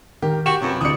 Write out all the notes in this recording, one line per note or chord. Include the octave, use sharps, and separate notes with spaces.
D#3 G4 A#4
F#4 G4 E7
F#2 C3 F4 B4
D2 C3 E4 D5 D#6 C#7